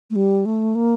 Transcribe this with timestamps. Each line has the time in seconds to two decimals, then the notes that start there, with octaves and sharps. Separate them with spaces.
0.10 A3
0.16 G3
0.46 A3
0.75 A#3